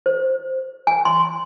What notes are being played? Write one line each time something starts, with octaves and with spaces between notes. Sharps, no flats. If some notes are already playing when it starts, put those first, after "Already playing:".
C5
G#5
C6